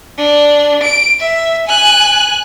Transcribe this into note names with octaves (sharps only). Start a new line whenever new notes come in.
D4
D7
E5
G#5 F#6